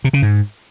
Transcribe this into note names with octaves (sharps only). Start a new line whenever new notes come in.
C3
C#3
G#2